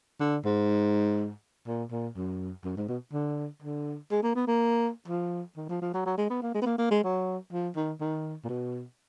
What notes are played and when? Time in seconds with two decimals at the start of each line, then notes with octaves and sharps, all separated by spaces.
0.20 D3
0.45 G#2
1.67 A#2
1.91 A#2
2.16 F#2
2.65 F#2
2.77 G#2
2.88 B2
3.13 D3
3.62 D3
4.11 G#3
4.23 A#3
4.35 B3
4.47 A#3
5.08 F3
5.57 D#3
5.69 F3
5.82 F3
5.94 F#3
6.06 F#3
6.18 G#3
6.30 B3
6.42 A#3
6.54 G#3
6.62 B3
6.66 A#3
6.78 A#3
6.91 G#3
7.04 F#3
7.52 F3
7.76 D#3
8.01 D#3
8.44 A#2
8.49 B2